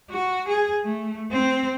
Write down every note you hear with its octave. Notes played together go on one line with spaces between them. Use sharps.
F#4
G#4
A3
C4